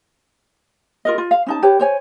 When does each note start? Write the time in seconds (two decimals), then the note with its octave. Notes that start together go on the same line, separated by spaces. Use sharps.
1.05 F4 A#4 D#5
1.18 F4
1.31 F5
1.46 C#4 D#4 A5
1.63 G4 B4 C#5
1.80 C5 C#5 G#5